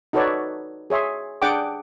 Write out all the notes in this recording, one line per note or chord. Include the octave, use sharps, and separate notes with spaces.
D#4 F#4 A4 B4 C#5 D5
G#4 C#5 E5 C6
D4 G#4 D5 F#5 G5 D6